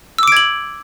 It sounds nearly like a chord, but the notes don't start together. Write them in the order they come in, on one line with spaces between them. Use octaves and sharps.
E6 D6 D7 G#6 F#7